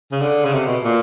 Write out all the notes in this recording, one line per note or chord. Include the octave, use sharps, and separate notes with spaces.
C#3
D3
C#3
C3
B2
A#2